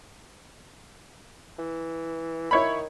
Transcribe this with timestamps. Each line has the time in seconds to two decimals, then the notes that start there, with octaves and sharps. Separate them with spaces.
1.59 E3
2.51 D#3 E4 C#5 B5